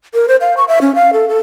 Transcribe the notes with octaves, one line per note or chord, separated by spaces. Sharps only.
A#4
C5
F5
C#6
E5
C#4
F5
A4
A4